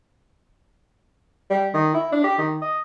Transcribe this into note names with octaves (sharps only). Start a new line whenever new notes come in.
G3
D#3
E4
D4
G4
D#3
D#5